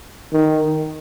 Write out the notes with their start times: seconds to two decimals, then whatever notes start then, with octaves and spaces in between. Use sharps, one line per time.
0.33 D#3